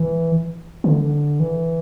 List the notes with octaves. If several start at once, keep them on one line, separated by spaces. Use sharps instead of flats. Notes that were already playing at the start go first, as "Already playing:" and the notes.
Already playing: E3
D3
E3